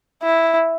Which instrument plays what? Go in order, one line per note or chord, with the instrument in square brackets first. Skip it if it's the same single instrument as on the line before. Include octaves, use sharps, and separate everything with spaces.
[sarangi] E4